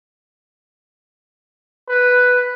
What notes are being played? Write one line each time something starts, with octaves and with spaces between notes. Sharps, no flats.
B4